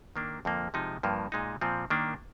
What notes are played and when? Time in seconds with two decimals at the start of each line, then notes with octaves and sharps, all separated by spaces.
0.16 D#3 A#3 D4
0.45 F2 D3 F3 A#3
0.74 C3 F3 G#3 D#4
1.03 G2 F3 A#3
1.32 A#2 G#3 D#4
1.61 A#2 F3 C4
1.90 D#3 A#3 D4